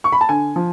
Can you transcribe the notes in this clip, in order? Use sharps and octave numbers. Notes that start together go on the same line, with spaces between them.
C#6
B5
A5
D3 G#5
F3